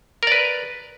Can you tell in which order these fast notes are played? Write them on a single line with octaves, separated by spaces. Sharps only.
A#4 D5 B4